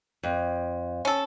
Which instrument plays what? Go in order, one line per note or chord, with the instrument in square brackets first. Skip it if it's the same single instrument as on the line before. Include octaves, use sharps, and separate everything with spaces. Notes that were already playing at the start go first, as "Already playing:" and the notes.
[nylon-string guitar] F2
[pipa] C#4 A4